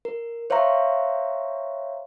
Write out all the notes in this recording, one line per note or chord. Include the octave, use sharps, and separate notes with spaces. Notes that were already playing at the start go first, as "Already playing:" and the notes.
A#4
C5 C#5 E5 F5 A#5 C#6